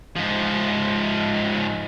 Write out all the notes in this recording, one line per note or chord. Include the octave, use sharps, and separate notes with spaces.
G#2 F3